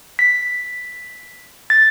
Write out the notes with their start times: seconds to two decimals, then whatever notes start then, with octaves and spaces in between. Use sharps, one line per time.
0.19 B6
1.70 A6